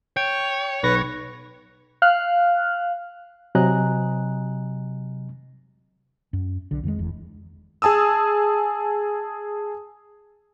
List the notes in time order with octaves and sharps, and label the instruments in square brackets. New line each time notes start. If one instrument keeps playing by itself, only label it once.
[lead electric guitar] C#5 [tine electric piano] G5
[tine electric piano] B1 C#6 A#6 [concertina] B4
[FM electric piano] F5 F6 F#6
[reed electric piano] C3 F#3 D#5 G#5 A#5 F#6
[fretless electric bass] F#2
B1 D3
F2 D#3 F#3 G#3
F1 E2
[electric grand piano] G#4 G#5 A5 D#6 E6